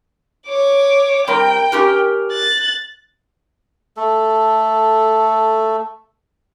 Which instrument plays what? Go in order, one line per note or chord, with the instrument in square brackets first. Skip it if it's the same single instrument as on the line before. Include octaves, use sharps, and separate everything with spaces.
[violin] C#5 D6
[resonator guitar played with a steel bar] G3 C4 A#4 [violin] G5
[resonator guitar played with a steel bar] C#4 G4 A#4
[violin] F#6 A6
[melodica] A3 A4